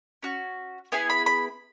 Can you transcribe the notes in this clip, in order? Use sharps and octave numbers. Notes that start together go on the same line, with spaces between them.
C#4 F#4
B3 E4 G#4 G#5
B5
B5